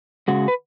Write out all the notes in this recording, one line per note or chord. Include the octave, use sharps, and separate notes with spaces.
C#3 G#3 F#4
B4